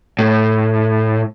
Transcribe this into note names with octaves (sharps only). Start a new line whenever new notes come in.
A2